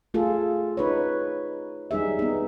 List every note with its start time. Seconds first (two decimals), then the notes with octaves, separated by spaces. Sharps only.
0.14 A3 F4 G#4 A4
0.77 D#4 B4 C#5
1.91 G3 D#4 G#4 E5
2.19 B3 D#4